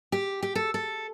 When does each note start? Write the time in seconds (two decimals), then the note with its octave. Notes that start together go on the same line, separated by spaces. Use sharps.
0.12 G4
0.43 G4
0.55 A4
0.74 A4